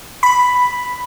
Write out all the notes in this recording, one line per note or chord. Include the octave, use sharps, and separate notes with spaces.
B5